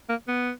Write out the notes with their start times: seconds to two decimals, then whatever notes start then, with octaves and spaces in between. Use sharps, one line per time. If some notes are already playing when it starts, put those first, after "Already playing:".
0.09 A#3
0.28 B3